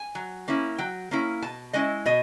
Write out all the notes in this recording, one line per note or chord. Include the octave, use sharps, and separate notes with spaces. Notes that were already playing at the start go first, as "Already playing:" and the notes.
Already playing: G#5
F#3
A#3 C#4 E4
F#3 G5
A#3 C#4 E4
B2 A5
G#3 C#4 E4 D#5
B2 D#5